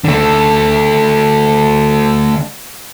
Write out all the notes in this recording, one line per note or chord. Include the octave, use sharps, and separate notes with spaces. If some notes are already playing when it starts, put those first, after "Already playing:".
D3 A3